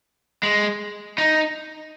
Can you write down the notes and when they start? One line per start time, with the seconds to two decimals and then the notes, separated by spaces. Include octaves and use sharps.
0.43 G#3
1.18 D#4